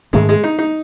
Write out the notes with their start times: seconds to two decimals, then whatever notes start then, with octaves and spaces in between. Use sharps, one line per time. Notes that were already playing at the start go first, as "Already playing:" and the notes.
0.13 G#2 D#3 G#3 A3 C#4
0.29 G#3
0.44 D#4
0.59 D#4